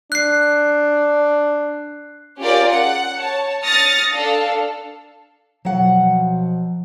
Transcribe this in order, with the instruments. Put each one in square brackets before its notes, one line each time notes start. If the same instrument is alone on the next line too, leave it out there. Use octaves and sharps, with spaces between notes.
[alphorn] D4 [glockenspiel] F#6 C7
[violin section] C#4 F4 G4 G#4 A#4 D5
F#5
C#5 A5
D#6 F6 A6 A#6 C#7
D4 A4 F5
[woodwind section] B2 F3 [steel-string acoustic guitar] F#3 F#5